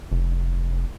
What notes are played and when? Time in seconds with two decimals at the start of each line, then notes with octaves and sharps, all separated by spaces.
0.12 F1